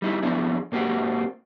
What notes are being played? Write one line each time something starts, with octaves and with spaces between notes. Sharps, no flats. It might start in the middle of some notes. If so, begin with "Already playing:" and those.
G3 D#4 E4
F2 A#2 F3 B3 D4 E4
G#2 A#3 C4 F#4 G4